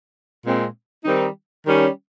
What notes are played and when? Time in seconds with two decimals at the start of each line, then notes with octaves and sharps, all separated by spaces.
0.45 A#2 G#3 C4
1.05 D#3 G3 C4 D#4
1.67 D#3 G3 C#4